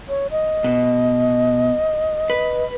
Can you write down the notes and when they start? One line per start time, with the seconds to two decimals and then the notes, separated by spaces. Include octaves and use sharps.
0.09 C#5
0.31 D#5
0.64 B2
2.30 B4